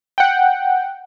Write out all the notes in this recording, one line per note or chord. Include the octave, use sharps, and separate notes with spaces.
F#5 G5